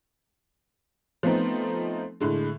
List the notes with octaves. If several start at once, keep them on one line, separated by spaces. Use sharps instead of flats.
F3 A3 B3 C4 D#4
A2 D3 G#3